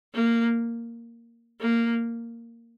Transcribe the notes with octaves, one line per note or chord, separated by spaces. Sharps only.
A#3
A#3